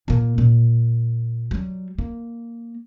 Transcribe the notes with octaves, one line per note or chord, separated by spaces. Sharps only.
A#2 A#3
A#2
F#3 G3
A#3